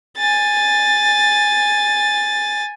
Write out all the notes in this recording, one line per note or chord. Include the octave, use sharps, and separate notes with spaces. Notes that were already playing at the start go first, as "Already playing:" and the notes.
G#5 A6